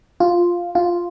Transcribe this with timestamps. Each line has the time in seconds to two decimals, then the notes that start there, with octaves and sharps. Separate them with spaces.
0.20 F4
0.75 F4